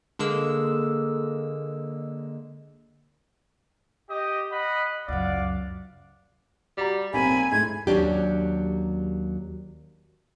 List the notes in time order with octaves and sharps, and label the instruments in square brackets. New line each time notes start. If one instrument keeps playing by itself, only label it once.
[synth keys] D3 G#3 A#3 E6
[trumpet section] G4 D#5
D#5 F#5 B5
[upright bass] C#2 F#2 [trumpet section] D5 F5 F#5
[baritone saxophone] G3 [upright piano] F#4 A#5
[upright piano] B1 C4 [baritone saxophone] A#3 [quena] G#5 [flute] B5
[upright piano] G#2 A3 E4 [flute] G#6
[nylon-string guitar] D#2 F#3 C#4 D4 G4